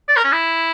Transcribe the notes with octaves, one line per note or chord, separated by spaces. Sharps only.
D5
A#4
C#4
E4